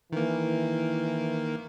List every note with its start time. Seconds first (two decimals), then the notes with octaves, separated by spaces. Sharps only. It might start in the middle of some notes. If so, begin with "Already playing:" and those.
0.12 D#3 E3 A#3